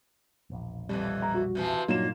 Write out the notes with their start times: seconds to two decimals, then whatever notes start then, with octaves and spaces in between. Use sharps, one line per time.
0.50 E1 A#1
0.89 F2 A2 E3 G3
1.22 A#5
1.34 F#4
1.55 C3 E3 F3
1.88 G2 A#2 F#3 A#3 D#4 E7